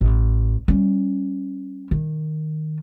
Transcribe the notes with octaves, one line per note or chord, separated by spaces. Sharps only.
A1
G3 C#4
D#3